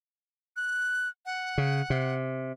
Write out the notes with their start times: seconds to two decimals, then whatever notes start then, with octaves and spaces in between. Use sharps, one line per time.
0.56 F#6
1.26 F#5
1.58 C#3
1.90 C3